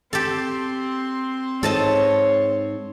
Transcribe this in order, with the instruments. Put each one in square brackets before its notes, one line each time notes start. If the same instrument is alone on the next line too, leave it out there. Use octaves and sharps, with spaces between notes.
[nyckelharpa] C4 C6 [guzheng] G4 A4
[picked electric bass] G#2 [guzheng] A4 D#5 A5 [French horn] C#5